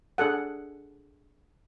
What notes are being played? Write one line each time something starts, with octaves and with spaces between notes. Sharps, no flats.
D4 G#4 A4 F#5